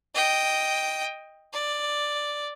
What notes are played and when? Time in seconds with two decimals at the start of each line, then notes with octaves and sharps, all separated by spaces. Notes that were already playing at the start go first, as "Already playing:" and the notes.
0.14 D#5 G5
1.53 D5